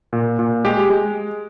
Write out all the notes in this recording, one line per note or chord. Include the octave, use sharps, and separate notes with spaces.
A#2
A#2
G#3 G4
G#3